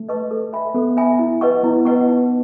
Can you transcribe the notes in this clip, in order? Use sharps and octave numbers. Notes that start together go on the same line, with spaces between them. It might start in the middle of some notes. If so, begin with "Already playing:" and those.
Already playing: A3
B4 D#5 A5 C#6
A4
E5 G#5 B5
B3 A4
E5 G#5 B5
E4
B4 D#5 F#5 C#6
B3 E4
B3 B4 D#5 F#5 C#6
D#4